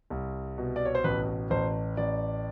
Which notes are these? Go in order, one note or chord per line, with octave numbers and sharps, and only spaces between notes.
C2
B2
D5
C#5
C5
A1 B4
A1 C5
A1 D5